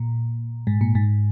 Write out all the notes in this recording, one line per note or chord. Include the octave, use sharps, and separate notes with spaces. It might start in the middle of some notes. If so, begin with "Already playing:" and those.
Already playing: A#2
G#2
A#2
G#2